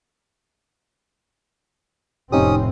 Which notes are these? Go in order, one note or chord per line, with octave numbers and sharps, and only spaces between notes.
F1 A2 C4 C#4 D#4 G4 D#6